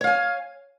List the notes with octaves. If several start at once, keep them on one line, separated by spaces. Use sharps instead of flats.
C#5 F5 G#5